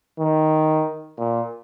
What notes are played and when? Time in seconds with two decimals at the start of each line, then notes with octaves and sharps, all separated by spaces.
0.19 D#3
1.18 A#2